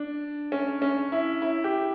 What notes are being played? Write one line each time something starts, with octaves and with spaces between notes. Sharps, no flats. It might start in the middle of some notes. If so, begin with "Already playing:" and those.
Already playing: D4
C#4
C#4
E4
E4
G4